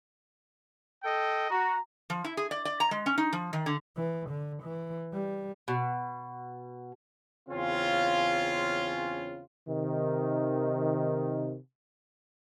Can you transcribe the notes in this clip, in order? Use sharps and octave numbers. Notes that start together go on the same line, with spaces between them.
A4 D#5 G5
F#4 A#5
F3
E4
G#4
D5
D5
A#5
G#3
C#4
D#4
F3
D#3
D3
E3
D3
E3
G3
B2
E2 C#3 C4 C#4 F4
C3 D#3